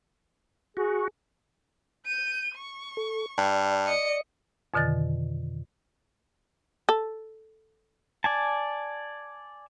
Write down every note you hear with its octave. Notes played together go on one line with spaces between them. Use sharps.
F#4 G#4
G6 D#7
C#6
A4
G2 D5
D#5 C#7
F2 B2 D3 D#3 A6
A4
D5 G#5 A5